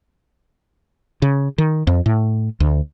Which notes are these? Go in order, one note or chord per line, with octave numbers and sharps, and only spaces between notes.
C#3
D#3
F2
A2
D2